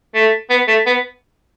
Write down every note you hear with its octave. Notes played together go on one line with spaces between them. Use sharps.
A3
B3
A3
B3